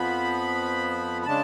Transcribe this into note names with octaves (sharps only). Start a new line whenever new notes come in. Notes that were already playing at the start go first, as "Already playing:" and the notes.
Already playing: F2 F3 B3 B5
B5
C#3 G#3 D4 A5